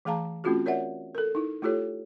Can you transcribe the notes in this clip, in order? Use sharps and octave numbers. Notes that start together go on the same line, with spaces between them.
E3 A3 G#4 F5 A5 A#5
A3 C4 C#4 F4 F#4 G#4
A#4 C#5 D5 E5 F#5
A4 A#4
D#4 E4
A3 E4 F4 G4 A4 C#5